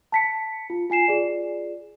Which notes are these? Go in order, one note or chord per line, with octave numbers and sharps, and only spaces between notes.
A5 B6 C#7
F4
F4 G#5 C7 E7
F4 G#4 D5